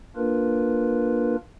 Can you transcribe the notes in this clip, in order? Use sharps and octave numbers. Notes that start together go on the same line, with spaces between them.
A#3 D4 F4 A#4 B4